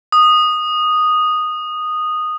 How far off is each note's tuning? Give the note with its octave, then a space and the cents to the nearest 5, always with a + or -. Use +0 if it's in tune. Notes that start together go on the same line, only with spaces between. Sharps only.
D#6 -10